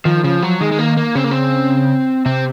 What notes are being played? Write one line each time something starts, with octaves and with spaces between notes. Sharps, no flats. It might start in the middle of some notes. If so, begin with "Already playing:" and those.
D#3 F3
C#3 F3
F3 F#3
D#3 G#3
G#3
A#3
A#3
C#3 C4
A#3
C4
C3 C4